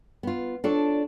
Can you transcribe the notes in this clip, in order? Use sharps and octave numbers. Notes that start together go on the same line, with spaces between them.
B3 F4
D4 F4 A4 C#5 D5